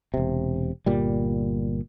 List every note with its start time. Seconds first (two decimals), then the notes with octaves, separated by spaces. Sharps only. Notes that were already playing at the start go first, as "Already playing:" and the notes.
0.14 E1 C3
0.86 G1 A#2 G3